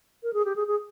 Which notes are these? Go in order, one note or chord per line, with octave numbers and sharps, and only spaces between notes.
A#4
G#4
G4
G#4
G#4